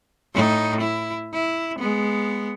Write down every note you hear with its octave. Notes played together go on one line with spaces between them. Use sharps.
A2 D#4
E4
E4
G#3 B3